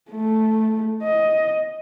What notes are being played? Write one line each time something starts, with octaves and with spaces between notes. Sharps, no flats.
A3
D#5